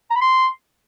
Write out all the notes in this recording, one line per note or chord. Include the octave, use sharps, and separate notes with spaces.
A#5
B5
C6